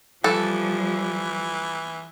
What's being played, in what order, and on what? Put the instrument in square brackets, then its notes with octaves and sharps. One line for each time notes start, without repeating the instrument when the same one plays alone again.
[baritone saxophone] E3 [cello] F3 G3 [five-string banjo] A4